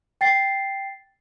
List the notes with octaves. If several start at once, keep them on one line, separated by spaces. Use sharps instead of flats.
G5 A6 C7